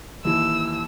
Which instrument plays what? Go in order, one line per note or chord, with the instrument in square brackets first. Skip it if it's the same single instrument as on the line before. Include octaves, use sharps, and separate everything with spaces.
[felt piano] D#2 E3 [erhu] E6